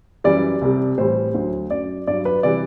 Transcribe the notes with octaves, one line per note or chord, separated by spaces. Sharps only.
F#2 E3 G3 D5
C2 C3 G3
A2 E3 G3 C5
D2 D3 F#3
F#2 F#3 D5
G2 F#3 D5
B4
C3 E3 G3 D5